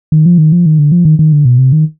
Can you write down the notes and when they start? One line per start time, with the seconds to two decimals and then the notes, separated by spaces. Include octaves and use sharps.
0.12 D#3
0.26 F3
0.38 D#3
0.52 F3
0.66 D#3
0.79 D3
0.92 F3
1.05 D#3
1.19 D#3
1.32 D3
1.45 B2
1.58 C3
1.72 D#3